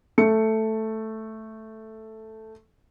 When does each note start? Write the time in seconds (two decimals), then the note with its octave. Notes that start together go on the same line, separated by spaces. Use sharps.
0.18 A3 C#7